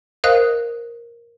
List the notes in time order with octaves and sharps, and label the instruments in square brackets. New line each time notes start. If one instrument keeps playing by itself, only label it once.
[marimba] A#4 C5 D#5 F5 D#6 F#6